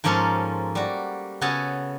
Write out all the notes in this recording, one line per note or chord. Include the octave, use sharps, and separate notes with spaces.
G#2 F3 A#3 C#4 A4 C6
G3 F#4
C#3 B3 F#4 A4 G#5 A5